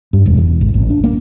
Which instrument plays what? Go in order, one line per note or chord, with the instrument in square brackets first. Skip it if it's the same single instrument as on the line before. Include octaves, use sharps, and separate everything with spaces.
[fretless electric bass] G2
E1
E2
G#1
A1
D4
A#3